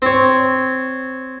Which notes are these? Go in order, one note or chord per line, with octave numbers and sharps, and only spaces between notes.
C4 C#5